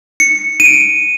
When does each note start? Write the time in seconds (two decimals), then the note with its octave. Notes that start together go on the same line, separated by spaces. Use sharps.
0.20 C#7
0.60 D#7
0.65 D7